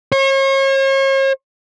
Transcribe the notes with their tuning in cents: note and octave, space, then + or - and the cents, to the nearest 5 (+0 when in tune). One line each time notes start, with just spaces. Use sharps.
C#5 -40